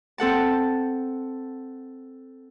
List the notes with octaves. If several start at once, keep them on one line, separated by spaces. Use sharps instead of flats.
C4 A4 F#5 A5